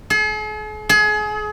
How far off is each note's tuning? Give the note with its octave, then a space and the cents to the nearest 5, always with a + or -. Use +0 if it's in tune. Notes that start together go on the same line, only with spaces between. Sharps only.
G#4 +45
G#4 +30